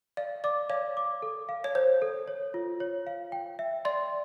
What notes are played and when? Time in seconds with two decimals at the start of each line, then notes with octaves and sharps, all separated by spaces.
0.17 D5 F5
0.44 D5 D6
0.69 C#5 F5
0.97 D6
1.22 A4
1.49 F5
1.64 C#5
1.75 C5 C#5
2.02 A4
2.28 C#5
2.54 F4
2.80 C#5
3.07 F5
3.32 G5
3.59 E5
3.85 D5 C6